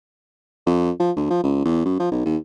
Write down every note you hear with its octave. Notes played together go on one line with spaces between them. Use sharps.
F2
F3
D2
F3
C#2
E2
F#2
F3
B1
D#2